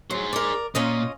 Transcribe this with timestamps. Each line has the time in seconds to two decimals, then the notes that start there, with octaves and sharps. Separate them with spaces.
0.11 F#3 G#4 C5
0.33 A#4 D5
0.75 A#2 C#4 F4 D#5